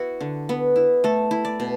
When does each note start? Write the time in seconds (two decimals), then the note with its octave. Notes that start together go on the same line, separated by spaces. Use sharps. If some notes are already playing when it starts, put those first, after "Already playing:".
Already playing: B3 E4 F#4
0.21 D3
0.49 B3
0.76 E4
1.04 A3 A4
1.31 E4
1.45 D5
1.60 B2